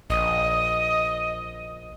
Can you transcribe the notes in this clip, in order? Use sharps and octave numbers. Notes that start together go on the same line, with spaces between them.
A#1 D#5